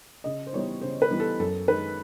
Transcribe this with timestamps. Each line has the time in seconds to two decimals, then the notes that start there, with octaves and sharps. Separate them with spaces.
0.24 C#3 D#5
0.47 C5
0.53 E3 G3 B3 D#4 C#5
0.81 C#3 C5
1.02 B4
1.10 E3 G3 B3 D#4
1.20 A4
1.40 F#2 A4
1.68 D#3 G#3 B4